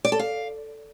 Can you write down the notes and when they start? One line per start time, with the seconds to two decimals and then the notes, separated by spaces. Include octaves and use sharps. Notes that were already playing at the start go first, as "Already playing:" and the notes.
0.05 D5
0.12 A4
0.19 F5